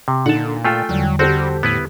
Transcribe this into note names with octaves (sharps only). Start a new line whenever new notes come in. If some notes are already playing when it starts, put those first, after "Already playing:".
C3
A#2 D3 D#4 F#5 A5
A3 F4 A4 G5 G#5
E2 D3 F#3 G3
D3 G3 C4 F#4 G4 A4 C5
A2 B3 E4 B4